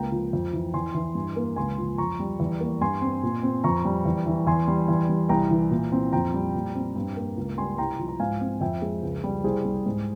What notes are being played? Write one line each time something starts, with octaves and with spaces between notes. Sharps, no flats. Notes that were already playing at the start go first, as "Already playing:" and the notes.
Already playing: C#2 A#3 G5 A#5
F3
F2
E3
E2 G#5 C6
E3
G2
A#3
C#2 G#5 C6
F3
F2 A#5 C#6
G3
E2
A#3
G2 G#5 C6
C4
A#2
C4
F2 A#5 C#6
G3
E2
E3
E2 G#5 C6
G3
E2
G3
C2 G5 A#5
E3
A#2
C4
F2 G5 A#5
G3
A#2
C4
G2
A#3
C#2
G3 G#5 C6
C2 G5 A#5
F3
A#5
G#2 F5 G#5
C4
F2 E5 G5
G#3
C#2
G3
C2 G#4 C5
G3
G#2